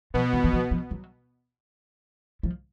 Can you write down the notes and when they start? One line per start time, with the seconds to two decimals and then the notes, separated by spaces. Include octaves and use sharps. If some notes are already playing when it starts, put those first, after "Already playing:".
0.14 B2 F3 B3
0.33 E3
0.44 E3
0.53 F3
0.71 F3
0.91 F#3
2.43 F3